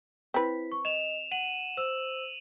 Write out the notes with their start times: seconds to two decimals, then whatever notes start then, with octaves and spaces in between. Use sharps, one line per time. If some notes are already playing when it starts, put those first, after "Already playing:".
0.34 C4 E4 B4 B6
0.72 C#6
0.85 D#5 E7 F7
1.31 F#5 D#7 F#7
1.77 C5 E6